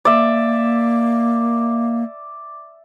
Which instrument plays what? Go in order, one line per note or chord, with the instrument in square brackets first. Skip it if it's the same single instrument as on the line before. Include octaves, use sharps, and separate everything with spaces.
[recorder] A#3 [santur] D5 E5